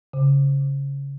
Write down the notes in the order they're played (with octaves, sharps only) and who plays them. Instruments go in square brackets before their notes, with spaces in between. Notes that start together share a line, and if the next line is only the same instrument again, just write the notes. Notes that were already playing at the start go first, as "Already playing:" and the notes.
[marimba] C#3